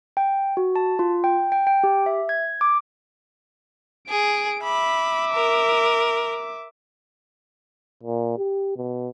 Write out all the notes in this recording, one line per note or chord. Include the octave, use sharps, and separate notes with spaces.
G5
F#4
A5
F4
G5
G5
G5
G4
E5
G#6
D6
G#4 D7
E5 B5 D6
A#4
A#2
G4
B2